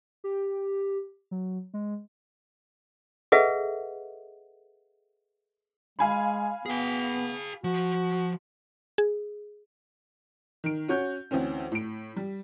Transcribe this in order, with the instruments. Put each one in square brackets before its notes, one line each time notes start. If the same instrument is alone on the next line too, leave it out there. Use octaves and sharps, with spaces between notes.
[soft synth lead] G4
F#3
G#3
[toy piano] G#4 A4 B4 D#5 E5 F#5
[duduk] G#3 [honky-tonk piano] F5 G#5 B5
[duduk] B3 [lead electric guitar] G#4 G5
[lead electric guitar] F3 [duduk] F#4
[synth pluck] G#4
[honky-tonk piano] D#3 D7
C#4 F#4 C#5 G6
D2 E3 C4 C#4
A2 D7
G3